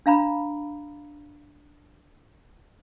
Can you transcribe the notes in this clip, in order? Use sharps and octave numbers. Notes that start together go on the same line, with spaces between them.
D4 F5 A#5 B5